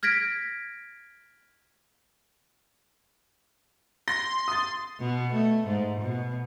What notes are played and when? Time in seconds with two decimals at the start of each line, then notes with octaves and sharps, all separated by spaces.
0.03 F6 G#6 A#6 B6 D7
4.08 C6 A#6
4.48 D#6 A6
4.99 B2
5.34 A3
5.67 G#2
6.01 B2